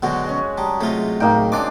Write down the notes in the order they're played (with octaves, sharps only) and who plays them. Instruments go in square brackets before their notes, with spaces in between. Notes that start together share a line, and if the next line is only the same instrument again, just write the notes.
[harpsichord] B2 D3 F#3 [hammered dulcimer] G#3 F#4 G5
[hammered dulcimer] G#3 C#4
[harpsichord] G3 [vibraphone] A5 A#5 D#6
[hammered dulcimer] C3 D#5 [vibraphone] F#3 G#4 [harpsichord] A3 F4
[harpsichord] A2 [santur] A#3 D#4 G5
[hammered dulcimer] G#3 D4 [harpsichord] C#4 D5 D6